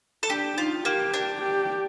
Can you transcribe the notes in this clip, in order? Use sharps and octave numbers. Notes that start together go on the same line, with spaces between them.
A4
D4 G4
D#4 F4
A#3 G4
D4
G4